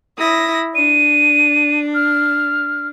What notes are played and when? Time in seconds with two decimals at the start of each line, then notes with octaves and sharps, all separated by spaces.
0.16 E4 D#6 A#6
0.75 D4 D#7
1.95 F6